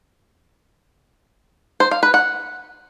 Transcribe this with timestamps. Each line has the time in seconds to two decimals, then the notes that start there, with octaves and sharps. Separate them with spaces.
1.80 C5
1.91 F5
2.03 B4
2.14 F#5